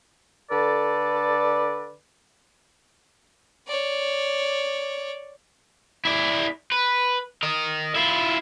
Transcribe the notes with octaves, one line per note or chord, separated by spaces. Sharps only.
D3 A4 B4 D5
C#5 D5
E4 D5
B4
A#4 D#5
E4 F4